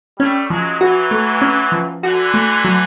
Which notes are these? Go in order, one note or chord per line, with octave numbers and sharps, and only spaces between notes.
G3 A3 C#4
F3 F#3 G#3
E3 F#3 F#4
A3
C#4
F3
D3 E3 F#4
A3
F#3